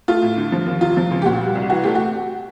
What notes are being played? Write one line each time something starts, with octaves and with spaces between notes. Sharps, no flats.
A3 F4
A2
D3
F3
D#2
C3 F4
F3
C#2
G4
A#2 F#4
G3
C2
E3 F#4
A3 G4
F#4